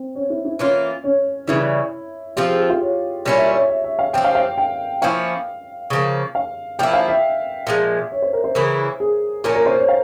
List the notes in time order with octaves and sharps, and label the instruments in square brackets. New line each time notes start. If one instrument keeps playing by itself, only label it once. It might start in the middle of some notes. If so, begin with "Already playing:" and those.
Already playing: [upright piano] C4
C#4
E4
E4
[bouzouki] E3 A#3 F4 [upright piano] C#4
[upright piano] C#4
[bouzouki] C#3 E3 G3 [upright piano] E4
[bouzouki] F3 C4 F4 [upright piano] G4
[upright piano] G#4
G4
F4
C#5
[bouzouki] A#2 G3 C#4 E4 [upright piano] C#5
[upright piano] E5
C#5
E5
E5
F5
[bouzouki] F3 C4 G4 [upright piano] G5
[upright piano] F5
F5
G5
[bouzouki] F3 A#3 C#4 E4 [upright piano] F5
[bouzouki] C#3 F3 A#3
[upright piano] F5
[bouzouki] F3 A#3 E4 [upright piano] G5
[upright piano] F5
E5
[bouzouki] A#2 F3 G#3
[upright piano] C#5
C5
A#4
C5
[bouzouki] C#3 E3 A#3 E4 [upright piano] A#4
[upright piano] G#4
[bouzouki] A#2 F3 A#3 C#4 [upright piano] A#4
[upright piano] A#4
C5
C#5
F5